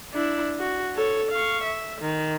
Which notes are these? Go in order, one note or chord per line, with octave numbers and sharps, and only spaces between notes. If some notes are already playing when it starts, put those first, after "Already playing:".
D4 E4
F#4
A4 C#5
F5 C#6
E5
D#3